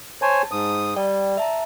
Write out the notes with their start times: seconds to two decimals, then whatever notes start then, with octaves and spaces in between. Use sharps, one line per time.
0.22 C5 C#5 G#5 A5
0.52 G#2 D#6
0.96 G3 D5 G5
1.37 E5 A5 A#5